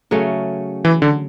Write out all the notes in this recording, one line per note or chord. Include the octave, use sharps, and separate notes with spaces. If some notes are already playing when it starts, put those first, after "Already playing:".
C#3 F#3 A3 C#4
E3
D3